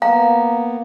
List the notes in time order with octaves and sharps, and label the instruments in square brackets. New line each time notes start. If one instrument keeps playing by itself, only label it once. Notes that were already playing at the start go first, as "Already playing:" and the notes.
[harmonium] A#3 B3 [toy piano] F5 [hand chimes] A#5